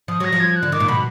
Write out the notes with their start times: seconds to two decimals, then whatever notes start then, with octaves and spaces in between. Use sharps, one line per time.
0.08 F3 D#6
0.20 F#3 A#6
0.32 F3
0.40 G#6
0.56 F#6
0.63 D3
0.72 D#3 D6
0.80 A#2
0.88 B2 B5